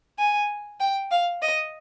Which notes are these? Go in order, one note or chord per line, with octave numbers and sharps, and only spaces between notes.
G#5
G5
F5
D#5